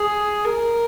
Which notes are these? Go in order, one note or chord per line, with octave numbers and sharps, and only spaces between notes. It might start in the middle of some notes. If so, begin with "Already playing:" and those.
Already playing: G#4
A#4